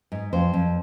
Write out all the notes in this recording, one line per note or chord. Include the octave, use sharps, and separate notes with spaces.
G#2
F2 C5
F2